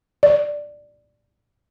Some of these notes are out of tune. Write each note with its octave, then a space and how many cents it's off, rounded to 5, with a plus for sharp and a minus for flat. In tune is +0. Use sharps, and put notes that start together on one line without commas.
D5 +5